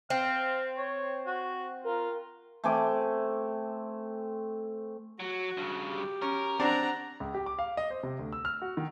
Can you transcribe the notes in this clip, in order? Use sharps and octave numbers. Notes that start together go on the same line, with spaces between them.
C4 F5
C#5
F#4
F4 A#4
A3 C4 G#5 D6
F#3 F#4
G2 C#3
G4
C#4 A#4
C4 D4 F#5 A#5
C#2
G4
D6
F5
D#5
C5
C3
D2
E6
F6
F#4
D#3